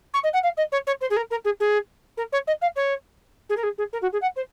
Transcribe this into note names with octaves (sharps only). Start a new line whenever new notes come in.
C#6
D#5
F#5
F5
D#5
C#5
C#5
C5
G#4
A#4
A#4
G#4
G#4
A#4
C#5
D#5
F5
C#5
G#4
A#4
G#4
G#4
A#4
F#4
G#4
F#5
C5